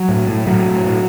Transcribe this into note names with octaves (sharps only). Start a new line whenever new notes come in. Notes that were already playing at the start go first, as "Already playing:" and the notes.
Already playing: F#3
A2
A2
A2 F#3
A2
A2